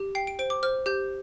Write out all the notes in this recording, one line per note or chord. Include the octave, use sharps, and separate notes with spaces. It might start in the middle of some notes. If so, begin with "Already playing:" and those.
Already playing: G4
G5 C7
D7
C5 D7
D6
C5 F6
G4 G6